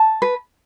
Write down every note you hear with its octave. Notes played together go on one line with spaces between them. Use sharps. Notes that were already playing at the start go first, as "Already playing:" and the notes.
Already playing: A5
B4